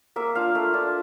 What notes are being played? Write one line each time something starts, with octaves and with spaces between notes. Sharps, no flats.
A#3 E5
D4 F4 F5
A3 E5
D4 F4